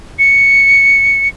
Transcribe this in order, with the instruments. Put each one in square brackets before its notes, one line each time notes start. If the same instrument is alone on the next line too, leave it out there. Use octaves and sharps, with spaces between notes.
[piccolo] C#7